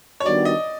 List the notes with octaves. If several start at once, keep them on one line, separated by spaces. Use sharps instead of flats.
C#5
D#3 G3 B3 D4 F#4 D5
D#5